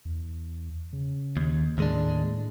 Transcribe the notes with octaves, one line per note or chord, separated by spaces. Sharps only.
E2
C#3
D#2
D#2 A2 G#3 D4